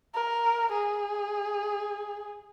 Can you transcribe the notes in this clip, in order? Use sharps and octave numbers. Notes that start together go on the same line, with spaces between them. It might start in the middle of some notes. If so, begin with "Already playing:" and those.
A#4
G#4